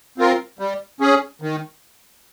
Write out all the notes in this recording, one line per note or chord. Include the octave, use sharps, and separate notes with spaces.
C4 F4 A#4
G3
C#4 G#4
D#3